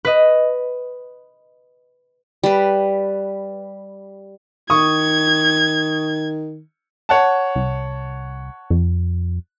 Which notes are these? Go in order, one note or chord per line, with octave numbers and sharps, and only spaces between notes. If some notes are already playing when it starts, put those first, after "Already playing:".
B4 D#5
G3 B4
D#3 C#6 D#6 G#6
C#5 F#5 A5
C2
F2